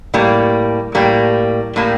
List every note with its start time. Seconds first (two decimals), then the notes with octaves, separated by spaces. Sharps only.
0.14 A2 G3 A#3
0.95 A2 G3 A#3
1.76 A2 G3 A#3